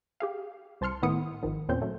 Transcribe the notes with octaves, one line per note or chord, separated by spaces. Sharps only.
G4 G#4 F5
C2 C5 A5 C6 F6 C#7
A2 D#3 B3 E4 D#6 C#7
G#1 D#3 F3
E2 A#2 C4 C#4 C5 G6
F#3 A3